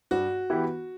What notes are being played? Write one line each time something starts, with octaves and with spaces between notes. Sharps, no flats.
G2 F#4
E3 B3 E4 G4